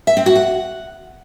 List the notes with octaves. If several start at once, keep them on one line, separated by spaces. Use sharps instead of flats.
E5
C4
F#4
F#5